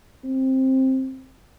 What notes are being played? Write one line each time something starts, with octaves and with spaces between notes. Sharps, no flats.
C4